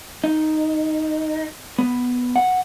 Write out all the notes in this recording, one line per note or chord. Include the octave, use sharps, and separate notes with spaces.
D#4
B3
F#5